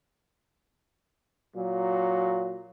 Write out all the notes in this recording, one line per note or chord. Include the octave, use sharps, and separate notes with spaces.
A#2 F#3